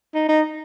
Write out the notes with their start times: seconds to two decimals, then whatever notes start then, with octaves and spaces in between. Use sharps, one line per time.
0.14 D#4
0.28 D#4